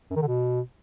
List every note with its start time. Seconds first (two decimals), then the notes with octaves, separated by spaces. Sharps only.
0.10 F#2
0.16 D#3
0.22 D3
0.27 B2